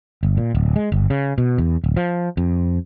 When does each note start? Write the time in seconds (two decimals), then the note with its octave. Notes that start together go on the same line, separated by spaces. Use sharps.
0.23 G1
0.37 A#2
0.54 D1
0.76 G#3
0.92 G1
1.10 C#3
1.38 B2
1.58 E2
1.84 D1
1.96 F3
2.37 F2